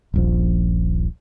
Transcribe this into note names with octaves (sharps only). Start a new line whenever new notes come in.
D#1 A#1 F3